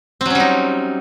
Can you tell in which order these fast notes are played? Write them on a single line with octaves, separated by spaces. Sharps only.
C4 F#3 C#4 G3 D#4